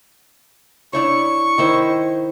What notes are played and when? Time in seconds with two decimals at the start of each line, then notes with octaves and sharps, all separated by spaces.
0.93 D4 E4 C#5 C#6
1.58 D#3 E4 C5